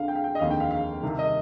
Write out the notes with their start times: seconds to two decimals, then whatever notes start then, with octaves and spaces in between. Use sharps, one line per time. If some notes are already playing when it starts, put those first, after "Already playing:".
Already playing: D2 D3 F5
0.08 G5
0.16 F5
0.24 G5
0.35 D#5
0.39 F1 D#2 D3 F5
0.50 G5
0.60 F5
0.71 F5
1.03 C2 C3 D#3
1.19 D#5